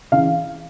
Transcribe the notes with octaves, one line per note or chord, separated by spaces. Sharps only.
C#3 E3 F5